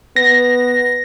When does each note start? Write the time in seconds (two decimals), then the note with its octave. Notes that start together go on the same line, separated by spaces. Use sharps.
0.16 B3 A#6